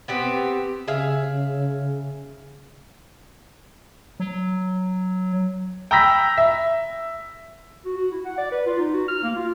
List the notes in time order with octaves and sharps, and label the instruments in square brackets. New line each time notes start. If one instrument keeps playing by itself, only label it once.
[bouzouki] B3 C4 G4
[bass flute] C#3 [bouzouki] G#4 E5 F5
[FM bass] F#3
[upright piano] G5 A#5 B5 E6 A#6 B6
E5
[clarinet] F#4
F#4
E4
F#5
D5
B4
F4
D#4
F#4
F6
A#3
F4